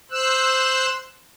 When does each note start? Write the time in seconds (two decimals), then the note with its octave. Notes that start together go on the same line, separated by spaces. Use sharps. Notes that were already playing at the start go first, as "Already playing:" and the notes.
0.11 C5 E6 F#6